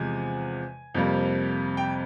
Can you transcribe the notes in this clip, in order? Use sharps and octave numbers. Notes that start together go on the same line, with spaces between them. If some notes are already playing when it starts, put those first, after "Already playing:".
Already playing: E2 C3 F3 G#3 G#5
F2 C3 G3 A#3
G5